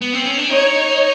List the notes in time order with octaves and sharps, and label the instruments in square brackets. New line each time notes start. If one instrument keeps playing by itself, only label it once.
[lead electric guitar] B3
C4
C#4
D4
[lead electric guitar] D#4 [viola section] C#5